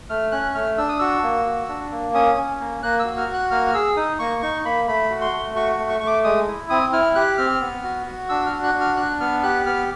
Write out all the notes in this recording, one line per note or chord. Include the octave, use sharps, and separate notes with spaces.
A3 F6
C#4 F#6
A3 F6
D4 E6
D#6
F#4 E6
A#3
F#4
D4
A#3
C#4 D#6
C#4
A#3
A#3 F#6
E6
F#4
F6
F#4
F#6
A#3 F6
F6
G#4 E6
D#4 D#6
A#3 C#6
D#4 C#6
A#3 B5
A3 B5
F#4
C6
A3
F#4 C#6
A3
C#6
A3 C#6
D6
G#3 D#6
E4
C4 D#6
E4 F6
G4 F#6
C4 F6
B3
F#4
F#4
D4 E6
F6
F#4
F#6
D4
F6
D4 F#6
B3 F6
G4 F#6
B3 F6